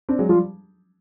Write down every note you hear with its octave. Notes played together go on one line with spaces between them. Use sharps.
C4 D4
F#3 G#3
F3 G3 F4